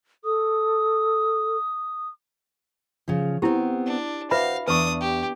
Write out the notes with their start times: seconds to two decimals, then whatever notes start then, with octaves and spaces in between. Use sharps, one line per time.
0.24 A4 D#6
3.08 C#3 F3
3.42 B3 C4 E4 G4
3.86 D4
4.31 F#4 B4 C5 E5 F5 B5
4.68 E2 D4 B4 C#6 D#6
5.01 G4